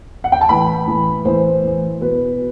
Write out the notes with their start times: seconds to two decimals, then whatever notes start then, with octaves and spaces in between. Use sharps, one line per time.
0.24 F#5
0.32 G5
0.41 A5
0.49 A2 E3 B5
0.88 A2 E3
1.25 A2 E3 C5
1.63 A2 E3
2.00 B2 B4